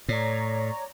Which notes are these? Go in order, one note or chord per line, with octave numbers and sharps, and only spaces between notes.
A2 C#5 D5 A#5